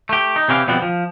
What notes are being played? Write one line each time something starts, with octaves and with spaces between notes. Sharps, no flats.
A3 G4
D#4
C3 E3 C#4 G4 F5
B2 F3 G3 B3 C4
F3